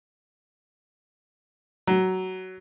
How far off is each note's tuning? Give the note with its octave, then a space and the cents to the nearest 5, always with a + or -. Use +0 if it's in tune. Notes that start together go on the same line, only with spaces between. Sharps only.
F#3 +15